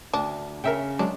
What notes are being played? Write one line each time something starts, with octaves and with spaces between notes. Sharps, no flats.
D2 D4
C#3 A#4 E5 G5
F#3 G#3 D4